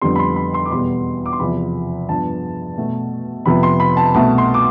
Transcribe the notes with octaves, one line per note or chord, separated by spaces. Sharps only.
F2 D3 G3 B3 C6
B5
C6
B5
C6
D6
E2 B2 G3 B3 C6
D6
C6
E2 C3 F3 B5
G2 F3 B3 A5
B2 A3
F2 C3 F3 B3 B5
C6
B5
A5
C2 B2 A3 A5
C6
D6